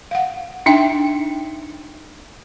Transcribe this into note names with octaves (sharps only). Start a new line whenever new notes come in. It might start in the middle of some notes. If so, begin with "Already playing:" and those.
F5 F#5
D4 D#4 E5 G5